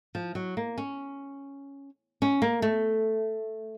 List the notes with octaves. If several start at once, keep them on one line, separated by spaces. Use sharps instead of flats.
F3
F#3
A#3
C#4
C#4
A#3
A3